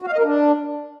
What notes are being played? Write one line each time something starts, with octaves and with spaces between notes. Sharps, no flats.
F#4
F5
D#5
A#4
D4